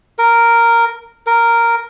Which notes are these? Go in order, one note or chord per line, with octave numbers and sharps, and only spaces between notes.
A#4
A#4